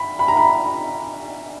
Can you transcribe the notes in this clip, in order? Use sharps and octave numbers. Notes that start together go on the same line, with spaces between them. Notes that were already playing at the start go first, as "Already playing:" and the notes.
Already playing: B5
B5
A#5
B5